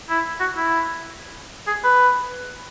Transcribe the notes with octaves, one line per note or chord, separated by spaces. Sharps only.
E4
F#4
E4
G#4
B4